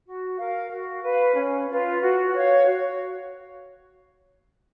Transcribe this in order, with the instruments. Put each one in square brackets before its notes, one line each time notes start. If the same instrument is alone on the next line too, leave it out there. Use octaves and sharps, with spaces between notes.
[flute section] F#4
A#4 F5
F#4
B4 F5
C#4
F4 B4
F#4
C#5 F5
F#4